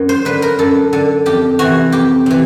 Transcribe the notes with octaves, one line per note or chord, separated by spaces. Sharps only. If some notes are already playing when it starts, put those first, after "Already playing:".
Already playing: F#2
C5
D3 B4
A#4
F#2 A4
D3 A4
F2 G4
C3 E3 F#4
F2 G4
C3 E3